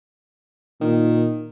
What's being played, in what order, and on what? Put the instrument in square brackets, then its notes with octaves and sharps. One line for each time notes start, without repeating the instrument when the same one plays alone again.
[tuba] A#2 [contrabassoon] D#3